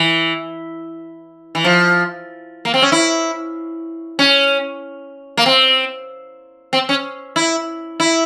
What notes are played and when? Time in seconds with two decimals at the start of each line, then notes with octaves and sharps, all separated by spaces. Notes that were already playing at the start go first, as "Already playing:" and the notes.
Already playing: E3
1.55 E3
1.64 F3
2.65 A#3
2.74 C4
2.82 C#4
2.92 E4
4.19 C#4
5.37 A#3
5.46 C4
6.73 C4
6.89 C#4
7.36 E4
8.00 E4